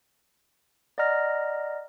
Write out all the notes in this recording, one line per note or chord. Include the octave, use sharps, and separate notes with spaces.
D5 D#5 F#5 A#5 F6 A#6